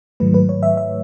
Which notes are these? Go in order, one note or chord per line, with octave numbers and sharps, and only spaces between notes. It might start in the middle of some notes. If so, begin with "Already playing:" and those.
G#2 D#3 F#3 A3 B4
B4
C#5
E5
E5